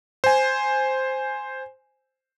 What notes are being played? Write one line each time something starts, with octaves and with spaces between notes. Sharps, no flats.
C5 G#5